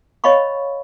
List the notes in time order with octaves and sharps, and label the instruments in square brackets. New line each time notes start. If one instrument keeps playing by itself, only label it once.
[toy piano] C#5 D#5 F5 B5 C#6